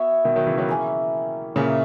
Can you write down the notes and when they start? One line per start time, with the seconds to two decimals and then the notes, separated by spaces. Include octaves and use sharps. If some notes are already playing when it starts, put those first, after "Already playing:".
Already playing: B3 F#4 C#5 E5
0.25 B2 D#3
0.36 D#3 F#3
0.47 C#3 E3
0.58 D#3 F#3
0.68 A#3 C#4 E4 G#4
1.56 A#2 C#3 A#3 C#4 E4 B4